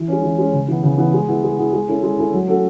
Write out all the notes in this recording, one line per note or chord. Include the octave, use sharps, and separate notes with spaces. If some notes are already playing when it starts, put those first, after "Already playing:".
Already playing: E3
G#3 C#4
E3
G#3 C#4
C#3
E3 B3
C#3
E3 B3
G#3
B3 E4 G#4
G#3
B3 E4 G#4
G#3
C#4 E4 A4
G#3
C#4 E4 A4
F#3
A3 C#4 F#4 A4